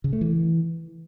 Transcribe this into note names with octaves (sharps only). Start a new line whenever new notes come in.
C#3
A3
E3